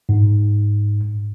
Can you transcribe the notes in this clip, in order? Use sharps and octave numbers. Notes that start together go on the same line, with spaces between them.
G#2